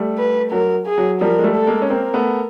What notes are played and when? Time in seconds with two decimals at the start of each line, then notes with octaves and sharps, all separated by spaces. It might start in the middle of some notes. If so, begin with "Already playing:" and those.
Already playing: G3 A3
0.18 B4
0.52 F#3 A#4
0.87 G#4
0.98 F#3
1.21 F3 G3 A#4
1.39 G#3
1.44 G3 A3
1.56 A4
1.67 G#3 A#3
1.82 C#4
1.90 A#3 C4 A#4
2.14 A3 B3